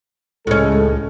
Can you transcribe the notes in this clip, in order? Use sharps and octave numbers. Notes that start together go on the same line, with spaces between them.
C#2 A2 G#3 C#4 A4